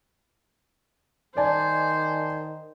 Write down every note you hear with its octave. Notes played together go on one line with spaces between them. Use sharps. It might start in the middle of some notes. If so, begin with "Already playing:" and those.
D#3 C5 D5 G#5 A5